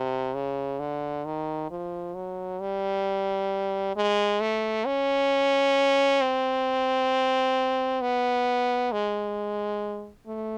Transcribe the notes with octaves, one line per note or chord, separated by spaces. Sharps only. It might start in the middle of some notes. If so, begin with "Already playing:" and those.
Already playing: C3
C#3
D3
D#3
F3
F#3
G3
G#3
A3
C#4
C4
B3
G#3
A3